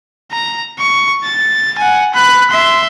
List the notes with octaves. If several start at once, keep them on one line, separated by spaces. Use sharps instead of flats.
A#5
C#6
A6
F#5 G#5
B5 F#6
E5 C6